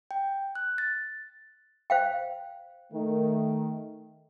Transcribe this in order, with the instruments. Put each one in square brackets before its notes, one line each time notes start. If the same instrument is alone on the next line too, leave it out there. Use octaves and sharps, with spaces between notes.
[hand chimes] G5
F#6
A6
[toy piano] C5 F5 G5
[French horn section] D#3 A3